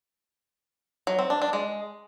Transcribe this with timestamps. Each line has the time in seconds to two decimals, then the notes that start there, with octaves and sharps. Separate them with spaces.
1.07 F#3
1.19 C4
1.30 D4
1.42 D4
1.53 G#3